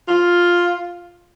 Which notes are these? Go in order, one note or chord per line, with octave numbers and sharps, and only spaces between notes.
F4